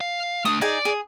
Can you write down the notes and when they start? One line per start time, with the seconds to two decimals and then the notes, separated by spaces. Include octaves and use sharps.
0.01 F5
0.45 A3 D4 D#6
0.61 D#4 G#4 D5 G#5
0.85 G#4